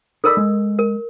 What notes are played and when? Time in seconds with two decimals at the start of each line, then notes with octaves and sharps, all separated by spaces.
0.24 D#4 A4 A#4 D5 B5 E6
0.37 G#3
0.79 A#4